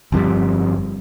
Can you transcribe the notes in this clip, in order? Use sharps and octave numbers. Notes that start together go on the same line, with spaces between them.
G1 F2 G#2 G3